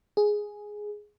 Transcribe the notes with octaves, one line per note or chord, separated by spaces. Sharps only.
G#4